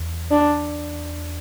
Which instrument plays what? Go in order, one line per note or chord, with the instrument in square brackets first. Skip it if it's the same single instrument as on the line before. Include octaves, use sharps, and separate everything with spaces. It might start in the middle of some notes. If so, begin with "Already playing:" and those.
Already playing: [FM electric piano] E2
[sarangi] D4